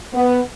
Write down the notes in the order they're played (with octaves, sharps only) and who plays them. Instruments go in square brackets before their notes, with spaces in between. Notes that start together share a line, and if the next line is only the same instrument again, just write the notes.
[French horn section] B3